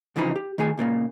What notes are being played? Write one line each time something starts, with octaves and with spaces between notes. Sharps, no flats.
C2 C#3 E3 F3 D#4 B5
G4
D#3 A3 G#4 G#5
C#2 A#2 C#3 A#3